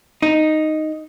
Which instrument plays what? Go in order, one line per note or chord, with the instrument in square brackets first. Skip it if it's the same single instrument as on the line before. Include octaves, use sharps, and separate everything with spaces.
[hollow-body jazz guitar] D#4